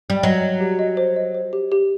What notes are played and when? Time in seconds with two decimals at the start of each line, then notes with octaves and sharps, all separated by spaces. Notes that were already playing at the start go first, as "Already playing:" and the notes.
0.10 G3
0.23 F#3 D#5
0.42 D#5
0.60 G4
0.79 D#5
0.97 C5
1.16 D#5
1.34 C5
1.53 G4
1.72 G4